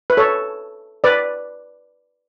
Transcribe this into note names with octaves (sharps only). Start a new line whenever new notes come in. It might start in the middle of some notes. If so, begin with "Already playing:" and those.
B4
A4 C#5
B4 D5